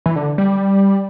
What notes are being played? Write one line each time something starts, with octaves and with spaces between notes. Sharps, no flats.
E3
D3
G3